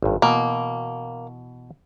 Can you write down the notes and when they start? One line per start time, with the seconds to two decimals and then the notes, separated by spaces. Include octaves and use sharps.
0.03 G#1 G2
0.22 B2 E3 A#3